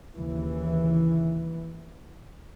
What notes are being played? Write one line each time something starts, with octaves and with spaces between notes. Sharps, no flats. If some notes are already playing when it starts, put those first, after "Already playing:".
D#2 C#3 E3